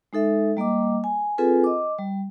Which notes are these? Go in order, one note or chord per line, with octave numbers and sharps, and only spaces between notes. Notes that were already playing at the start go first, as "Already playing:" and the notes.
G#3 D#4 A4 E5
G3 A#3 D#5 D6
G#5
C4 F4 G#4 A4 B4 G#5
D#5 D6
G3